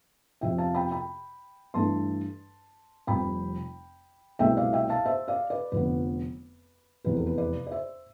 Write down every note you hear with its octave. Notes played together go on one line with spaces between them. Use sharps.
F2 C3 F3 E5 G5
F5 A5
G5 B5
G5 B5
G2 E3 A3 D4 A5 C6
F1 F2 C3 G3 G5 B5
C2 B2 A3 C4 E5 G5
D5 F5
E5 G5
F5 A5
C5 E5
D5 F5
B4 D5
F1 F2 D3 F3 B3 B4
F1 E2 C3 B4
A4
B4
B4 D5
D5
C5 E5